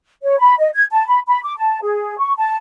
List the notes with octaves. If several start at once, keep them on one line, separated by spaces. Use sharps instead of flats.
C#5
B5
D#5
G#6
A5
B5
B5
D6
A5
G#4
C#6
A5